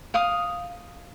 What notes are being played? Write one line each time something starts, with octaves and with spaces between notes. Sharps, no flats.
F5 D#6